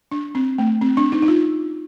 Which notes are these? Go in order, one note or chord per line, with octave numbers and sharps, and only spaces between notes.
D4
C4
A3
C4
D4
D#4
D#4
F4